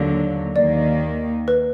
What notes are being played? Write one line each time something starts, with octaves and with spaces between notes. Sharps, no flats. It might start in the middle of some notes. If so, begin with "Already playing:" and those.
Already playing: D#2 D3 F#3
D#2 D#3 A#3 D5
B4